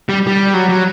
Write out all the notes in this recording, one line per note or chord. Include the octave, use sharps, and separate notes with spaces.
G3
G3
F#3
F#3